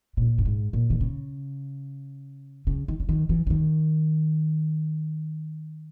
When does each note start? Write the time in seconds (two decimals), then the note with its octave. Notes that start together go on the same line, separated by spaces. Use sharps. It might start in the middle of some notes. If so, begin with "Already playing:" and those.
0.17 A#2
0.38 G2
0.45 G#2
0.73 A#2
0.90 D#3
1.01 C#3
2.67 C#3
2.88 D#3
3.00 C#3
3.09 D#3
3.29 E3
3.47 C#3
3.50 D#3